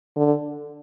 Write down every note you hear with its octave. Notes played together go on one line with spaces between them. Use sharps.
D3